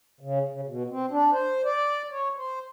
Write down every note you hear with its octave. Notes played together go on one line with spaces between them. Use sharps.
C#3
C#3
B2
C4
D4
C5
D5
C#5
C5